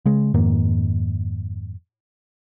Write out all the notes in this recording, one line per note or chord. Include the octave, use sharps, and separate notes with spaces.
C#3 G#3
F2 G#2 D#3 A#3